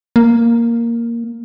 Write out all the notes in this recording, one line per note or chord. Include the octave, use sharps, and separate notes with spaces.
A#3